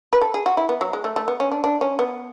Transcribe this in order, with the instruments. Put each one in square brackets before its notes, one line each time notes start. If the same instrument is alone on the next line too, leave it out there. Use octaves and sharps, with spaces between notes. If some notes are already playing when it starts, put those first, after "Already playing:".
[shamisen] B4
A4
G#4
F#4
E4
B3
F#3
G#3
A3
A3
B3
C#4
D4
D4
C#4
B3